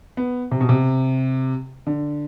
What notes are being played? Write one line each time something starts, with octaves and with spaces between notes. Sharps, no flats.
B3
C3
B2
C3
D3